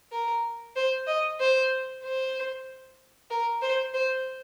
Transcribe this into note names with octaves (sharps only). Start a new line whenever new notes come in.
A#4
C5
D#5
C5
C5
A#4
C5
C5